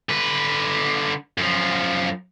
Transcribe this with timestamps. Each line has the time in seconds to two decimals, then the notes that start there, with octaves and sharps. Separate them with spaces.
0.09 D3 B4
1.38 F#2 F3